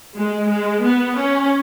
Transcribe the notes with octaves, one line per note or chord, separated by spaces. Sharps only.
G#3
G#3
B3
C#4